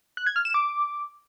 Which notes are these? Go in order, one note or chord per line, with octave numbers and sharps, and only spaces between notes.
F#6
G#6
F6
E7
D6